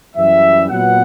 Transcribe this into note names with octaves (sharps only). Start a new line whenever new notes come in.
F#2 E3 G3 E5
A#2 F#3 B3 F#5